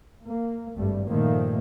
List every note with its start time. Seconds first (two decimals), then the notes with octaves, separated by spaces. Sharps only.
0.25 A#3
0.76 G#1 G2 G3 A3
1.08 G2 A#2 D#3 F3 A3 A#3